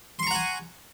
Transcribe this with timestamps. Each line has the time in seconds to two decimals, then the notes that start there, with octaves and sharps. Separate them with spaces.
0.19 C6
0.23 C#6
0.27 A#5
0.31 F#5
0.35 G#5